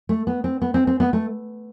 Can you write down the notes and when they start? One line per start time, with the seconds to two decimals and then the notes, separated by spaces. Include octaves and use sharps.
0.09 A3
0.27 B3
0.44 C4
0.62 B3
0.74 C4
0.87 C4
1.00 B3
1.13 A3